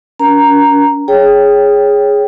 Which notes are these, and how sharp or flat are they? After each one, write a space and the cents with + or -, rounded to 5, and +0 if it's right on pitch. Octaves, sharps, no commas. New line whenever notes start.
C#4 +45 A#4 +25 A#5 +0
G#4 +0 C#5 +0 G5 +0